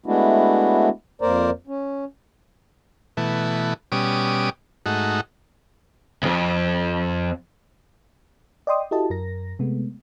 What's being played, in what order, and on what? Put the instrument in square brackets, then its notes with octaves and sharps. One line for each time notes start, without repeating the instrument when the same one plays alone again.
[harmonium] G#3 A3 B3 D4 E4 F#4
F2 A#3 A#4 C5 D5 A#5
C#4
[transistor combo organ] B2 E3 A3
B2 G3 C#4 D6 D#6
G#2 A3 D#4 F#4
[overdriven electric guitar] C2 F2
[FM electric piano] D5 D#5 G5 C6 D#6
E4 F#4 G4 A4 D#5 A5
F#2 A#4 A#6
C3 G#3 A3 B3